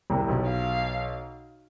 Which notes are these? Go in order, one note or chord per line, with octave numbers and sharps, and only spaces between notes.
C2 C3
C3
B1 B2
F5